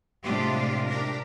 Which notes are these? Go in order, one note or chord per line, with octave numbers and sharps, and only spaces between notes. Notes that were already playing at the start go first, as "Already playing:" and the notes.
A2 C3 G#3 D4 F4 G4
D4 G4 A#4